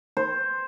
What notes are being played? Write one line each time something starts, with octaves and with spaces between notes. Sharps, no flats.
C5